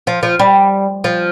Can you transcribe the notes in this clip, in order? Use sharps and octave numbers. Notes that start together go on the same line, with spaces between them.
F3
F3
G3
F3